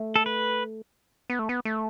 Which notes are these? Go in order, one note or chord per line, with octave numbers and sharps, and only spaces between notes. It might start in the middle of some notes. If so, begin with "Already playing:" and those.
Already playing: A3
A4
B4
B3
A3
B3
A3